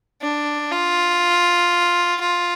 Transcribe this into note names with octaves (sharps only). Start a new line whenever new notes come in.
D4
F4
F4